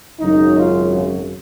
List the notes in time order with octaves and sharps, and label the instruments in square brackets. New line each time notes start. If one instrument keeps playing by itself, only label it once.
[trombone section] G#1 F#2 C#3 F#3 D#4
F4